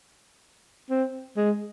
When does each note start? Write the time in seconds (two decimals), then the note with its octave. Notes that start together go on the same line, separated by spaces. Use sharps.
0.90 C4
1.37 G#3